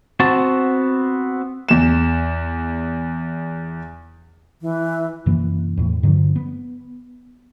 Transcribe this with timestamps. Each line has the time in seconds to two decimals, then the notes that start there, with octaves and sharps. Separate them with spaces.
0.20 B3 C4 F#4 A5
1.69 E2 E7
4.62 E3
5.26 F#2 C3 E3 A#3
5.77 E2 A2
6.03 G2 D3 F3 F#3
6.36 B3